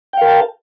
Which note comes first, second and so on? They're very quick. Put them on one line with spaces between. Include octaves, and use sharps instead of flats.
G5 F5 A#4 A5